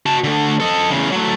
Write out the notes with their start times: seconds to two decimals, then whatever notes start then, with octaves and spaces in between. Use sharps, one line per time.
0.06 F#4 A5
0.24 D3 A3
0.60 A4 D#5
0.90 E2 C#3
1.12 F#3 A3